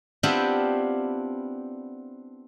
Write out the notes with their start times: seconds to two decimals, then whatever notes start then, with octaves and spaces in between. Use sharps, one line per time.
0.23 B3 C4 D4 E4 F4 G4